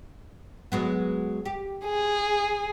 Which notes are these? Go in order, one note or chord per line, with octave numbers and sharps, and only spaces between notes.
F#3 G#3 B3
G4
G#4